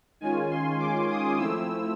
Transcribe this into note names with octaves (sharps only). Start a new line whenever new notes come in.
D#3 G#3 C#4 F4 G#5
C6
D6
D#6
F3 A3 C4 E4 E6